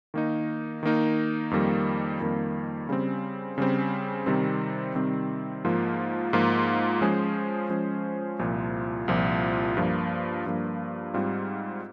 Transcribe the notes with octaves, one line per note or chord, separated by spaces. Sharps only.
D#3 A#3 D#4
D#3 A#3 D#4
F2 D#3 G3 A#3
F2 D#3 G3 A#3
C#3 G3 C4
C#3 G3 C4
C3 D#3 G3 C4
C3 D#3 G3 C4
G#2 F3 A#3 F4
G#2 F3 A#3 F4
F3 G#3 C#4 G#4 C5
F3 G#3 C#4 G#4 C5
C2 A#2 F3
C2 A#2 F3
G2 F3 A#3
G2 F3 A#3
G#2 G3 C4 F4